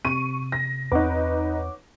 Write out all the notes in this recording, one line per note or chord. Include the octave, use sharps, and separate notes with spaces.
C3 C#6 D#7
A#6
E2 C4 D#4 B4 C#5 F#5 D6